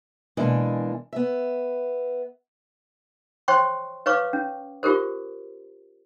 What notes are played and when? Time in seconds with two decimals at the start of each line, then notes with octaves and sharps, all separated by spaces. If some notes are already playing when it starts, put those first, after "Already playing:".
0.37 B2 E3 G#3 A#3 D4
1.13 B3 E5
3.48 C5 C#5 G5 C6 C#6
4.06 B4 C#5 F5 C#6 D6
4.33 C#4
4.83 F4 G4 G#4 A#4 C5